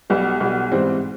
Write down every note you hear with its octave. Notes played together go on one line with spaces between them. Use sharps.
B1 B2 G3
B1 B2 G3
G#2 E3 G3 C4